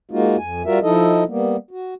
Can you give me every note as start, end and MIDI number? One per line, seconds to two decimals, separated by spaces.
0.11 0.37 56
0.11 0.37 58
0.11 0.37 63
0.11 0.37 65
0.11 0.37 66
0.37 0.63 41
0.37 0.63 80
0.65 0.79 55
0.65 0.79 65
0.65 0.79 66
0.65 0.79 70
0.65 0.79 76
0.82 1.24 53
0.82 1.24 63
0.82 1.24 64
0.82 1.24 69
0.82 1.24 75
1.29 1.57 55
1.29 1.57 58
1.29 1.57 59
1.71 1.94 66